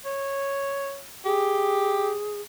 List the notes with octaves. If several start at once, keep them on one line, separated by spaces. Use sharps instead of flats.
C#5
G4 G#4